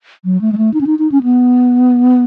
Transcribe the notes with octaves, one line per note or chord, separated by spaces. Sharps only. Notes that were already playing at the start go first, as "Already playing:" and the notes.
F#3
A3
G#3
A3
D#4
C#4
D#4
D#4
C#4
B3